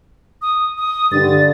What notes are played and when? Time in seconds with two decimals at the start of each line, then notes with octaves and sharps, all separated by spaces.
0.42 D#6
0.78 D#6
1.12 G2 D3 A6